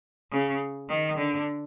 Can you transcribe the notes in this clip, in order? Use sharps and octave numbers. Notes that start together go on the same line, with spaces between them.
C#3
D#3
D3